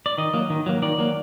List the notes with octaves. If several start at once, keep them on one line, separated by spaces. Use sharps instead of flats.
D5
D#3 D#5
F#3 A#3
D#3
F#3 A#3
D#3 D5
F#3 A#3